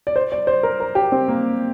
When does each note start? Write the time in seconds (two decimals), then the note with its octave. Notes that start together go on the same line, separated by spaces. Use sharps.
0.07 D5
0.16 C5
0.32 D5
0.47 C5
0.63 A#4
0.80 A#4
0.95 G4
1.12 C4
1.28 A#3